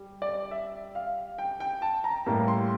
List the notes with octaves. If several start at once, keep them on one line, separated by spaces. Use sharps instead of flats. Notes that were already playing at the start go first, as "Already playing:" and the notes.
Already playing: G3
D5
E5
F5
G5
G5
A5
A#5
A2 G3 A#3
C6